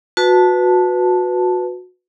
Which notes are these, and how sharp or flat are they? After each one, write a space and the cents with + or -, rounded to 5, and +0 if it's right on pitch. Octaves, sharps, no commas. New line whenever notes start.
F#4 -25 B4 +0 A5 +0